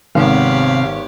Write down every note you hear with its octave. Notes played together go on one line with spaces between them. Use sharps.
G#1 C3 B3 G4 C#5 F5